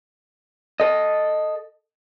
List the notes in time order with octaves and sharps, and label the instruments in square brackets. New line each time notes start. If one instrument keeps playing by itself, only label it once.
[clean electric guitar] A4 D#5